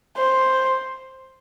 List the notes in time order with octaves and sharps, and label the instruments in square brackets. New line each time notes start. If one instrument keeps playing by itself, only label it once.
[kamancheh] C5